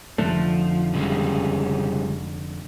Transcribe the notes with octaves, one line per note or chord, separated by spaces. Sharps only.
F1 D3 F3 A3
C#3 G3 G#3